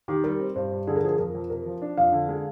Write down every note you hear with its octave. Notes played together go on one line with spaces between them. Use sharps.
D#3 G4
G3 A#4
C4
G2 C5
G2
D3 G#4
A#4
F3 G#4
F2 A#4
F2
C3 A#4
F3
D4
F2 F5
D3
G#3